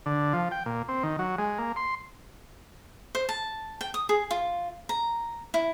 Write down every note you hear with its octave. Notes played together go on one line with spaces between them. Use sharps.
D3
F3
G5
A#2
C4
D#3
F#3
G#3
A#3
C6
C5
A5
G5
D#6
G#4
F4
A#5
E4